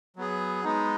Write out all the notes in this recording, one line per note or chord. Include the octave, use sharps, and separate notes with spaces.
F#3 B3 G#4
G#3 B3 D#4